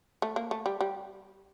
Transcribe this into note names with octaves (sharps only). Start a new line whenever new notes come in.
A3
A#3
A3
G3
G3